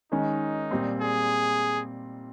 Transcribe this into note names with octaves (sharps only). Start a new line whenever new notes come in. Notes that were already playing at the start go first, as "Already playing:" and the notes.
D#3 G#3 C#4 D#4
A#2 G3 C4
G#4